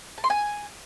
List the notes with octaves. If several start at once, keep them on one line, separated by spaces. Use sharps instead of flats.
A5
C6
G#5